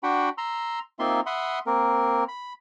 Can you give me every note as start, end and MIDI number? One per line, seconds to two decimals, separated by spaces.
0.03 0.29 62
0.03 0.29 66
0.03 0.29 78
0.03 0.29 79
0.03 0.29 83
0.38 0.79 82
0.38 0.79 84
0.38 0.79 88
0.99 1.20 58
0.99 1.20 60
0.99 1.20 63
0.99 1.20 65
0.99 1.20 76
0.99 1.20 84
1.26 1.59 76
1.26 1.59 78
1.26 1.59 83
1.26 1.59 84
1.26 1.59 87
1.66 2.24 58
1.66 2.24 60
1.66 2.24 70
2.28 2.53 83